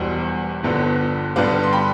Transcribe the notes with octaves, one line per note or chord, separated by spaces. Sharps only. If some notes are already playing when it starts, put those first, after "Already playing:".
Already playing: E1 E2 B2 G3 C5
G1 G2 D3 F3 B3
G2 D3 G3 B3 D5 F5
C6
G5 B5